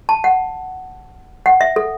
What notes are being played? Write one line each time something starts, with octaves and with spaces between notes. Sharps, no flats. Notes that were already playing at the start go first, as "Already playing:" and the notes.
A5
F#5
F#5
E5
A4